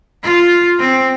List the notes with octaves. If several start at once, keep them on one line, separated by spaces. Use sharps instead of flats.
F4
C4